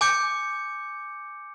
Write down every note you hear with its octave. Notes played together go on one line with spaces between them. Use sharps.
G#5 D6 G6 C#7